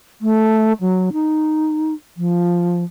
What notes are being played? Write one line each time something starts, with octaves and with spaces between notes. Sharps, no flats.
A3
F#3
D#4
F3